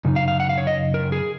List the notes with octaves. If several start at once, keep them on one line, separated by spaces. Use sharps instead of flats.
F#2 C#3 D#4
F5
F5
F#5
F5
C#5
D#5
A#4
G#4